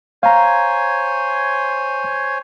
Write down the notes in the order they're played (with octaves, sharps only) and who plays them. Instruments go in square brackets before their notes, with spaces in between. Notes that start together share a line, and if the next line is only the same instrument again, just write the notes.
[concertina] C5 C#5 G#5 [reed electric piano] F5 A#5